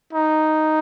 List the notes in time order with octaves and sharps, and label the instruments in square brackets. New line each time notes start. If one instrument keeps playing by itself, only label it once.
[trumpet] D#4